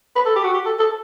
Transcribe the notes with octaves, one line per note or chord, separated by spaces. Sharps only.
B4
A4
G4
F#4
G4
A4
A4